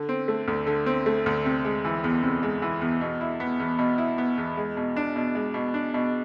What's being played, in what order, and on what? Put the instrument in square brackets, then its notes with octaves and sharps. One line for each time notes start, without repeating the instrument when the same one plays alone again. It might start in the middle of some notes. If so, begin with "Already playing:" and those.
Already playing: [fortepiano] D3
C4
A3
D2
D3
C4
A3
D2
C3
G#3
E3
E2
C3
G#3
E3
E2
B2
E4
B3
E2
B2
E4
B3
E2
G#3
B2
D4
B2
G#3
B2
D4
B2